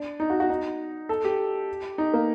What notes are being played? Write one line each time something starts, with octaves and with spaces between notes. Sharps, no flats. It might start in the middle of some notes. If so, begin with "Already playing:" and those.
Already playing: D4
D#4
F#4
F#4
D#4
A4
G4
D#4
A#3